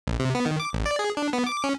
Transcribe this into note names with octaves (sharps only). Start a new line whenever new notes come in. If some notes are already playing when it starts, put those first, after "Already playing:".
A#1
C3
B3
D#3
D6
A1
D5
G#4
D4
B3
D6
C#4